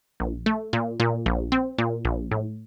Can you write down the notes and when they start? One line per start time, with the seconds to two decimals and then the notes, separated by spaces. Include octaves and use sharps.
0.20 A#1
0.46 A3
0.73 A#2
1.00 A#2
1.26 A#1
1.52 C4
1.78 A#2
2.05 A#1
2.31 A2